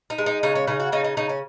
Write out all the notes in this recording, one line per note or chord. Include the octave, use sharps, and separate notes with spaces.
D#4
G#3
D#4
C#3 D#4
C#4
C#3 D#4
F#4
C#3 D#4
D#4
C#3 D#4
C#4